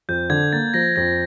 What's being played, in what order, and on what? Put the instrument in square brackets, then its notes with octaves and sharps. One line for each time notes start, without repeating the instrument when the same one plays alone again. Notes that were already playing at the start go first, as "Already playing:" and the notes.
[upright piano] F2 [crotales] G6
[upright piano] D3 [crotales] G#6
[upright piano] A#3 [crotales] A6
[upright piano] F3 [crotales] A#6
[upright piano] F2 [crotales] A#6